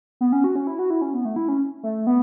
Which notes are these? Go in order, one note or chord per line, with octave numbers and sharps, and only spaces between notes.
B3
C#4
F#4
C#4
E4
F#4
E4
C#4
B3
A3
E4
C#4
A3
B3